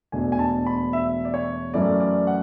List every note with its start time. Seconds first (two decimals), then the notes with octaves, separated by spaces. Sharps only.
0.12 E1 E2 B2 A3 D4 G#5
0.32 G#5
0.39 A5
0.66 B5
0.93 E5
1.25 D5
1.34 C#5
1.74 F#2 E3 A3 C#4 E4 D5
2.00 D5
2.27 F#5